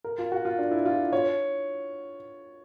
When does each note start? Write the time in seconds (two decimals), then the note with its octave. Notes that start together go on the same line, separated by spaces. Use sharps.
0.04 A#4
0.18 F4
0.32 F#4
0.45 F4
0.59 D4
0.71 E4
0.86 F4
1.13 C#5